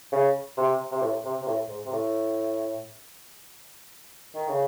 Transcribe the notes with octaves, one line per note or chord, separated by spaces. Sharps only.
C#3
C3
C3
A2
C3
C3
A2
G#2
C3
A2
D#3
C#3